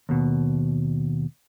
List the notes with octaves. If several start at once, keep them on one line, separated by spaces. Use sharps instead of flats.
D#2 B2